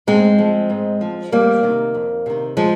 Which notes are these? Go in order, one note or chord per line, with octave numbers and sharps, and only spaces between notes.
G#2 G#3 C4
F3
G#2
F3
F2 G3 A#3
C3 D#3
F2
C3 D#3
F3 G#3